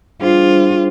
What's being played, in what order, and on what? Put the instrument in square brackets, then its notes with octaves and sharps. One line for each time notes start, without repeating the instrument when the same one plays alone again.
[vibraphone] G3 D4 G#4 C5 [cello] F4